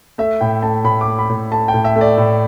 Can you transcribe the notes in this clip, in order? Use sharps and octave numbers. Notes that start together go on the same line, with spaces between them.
A3 E5
A2 G5
A3 A5
A2 B5
D6
A3
B5
A2
A3 A5
G5
A2
E5
A3
D5
A2